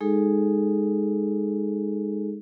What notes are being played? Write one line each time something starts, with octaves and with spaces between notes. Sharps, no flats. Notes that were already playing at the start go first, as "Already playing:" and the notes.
G#3 D#4 G#4 A4